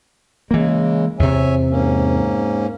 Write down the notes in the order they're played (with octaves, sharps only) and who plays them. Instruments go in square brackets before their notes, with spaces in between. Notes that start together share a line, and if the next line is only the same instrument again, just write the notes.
[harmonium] C#3 G#3 [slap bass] E3 A#3
[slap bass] E2 C3 [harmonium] C#5 E5 G#5
[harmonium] G#2 A#3 C#4